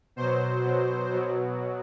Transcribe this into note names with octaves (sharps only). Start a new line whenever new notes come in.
B2 F#3 C5
B2 F#3
B2 F#3